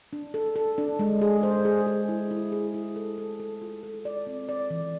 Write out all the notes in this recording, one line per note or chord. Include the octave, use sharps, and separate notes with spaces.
D4
A4
A4
D4
G#3
G#4
C5
G#4
G#4
E4
E4
G#4
E4
A4
A4
A4
F4
A4
D5
C4
D5
E3